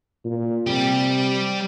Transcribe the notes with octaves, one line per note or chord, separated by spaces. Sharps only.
A#2
C3 G3 G4